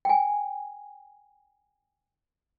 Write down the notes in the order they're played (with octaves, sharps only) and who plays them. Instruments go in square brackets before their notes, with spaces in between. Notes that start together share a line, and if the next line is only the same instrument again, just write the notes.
[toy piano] G5 G#5